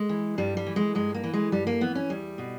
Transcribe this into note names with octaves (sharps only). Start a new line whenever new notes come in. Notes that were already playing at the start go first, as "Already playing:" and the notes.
Already playing: G#3
E3
G2 G3
G3
E3
G#3
G2 G#3
A#3
E3
G#3
G2 G3
A#3
E3 B3
C#4
E2 G3
B2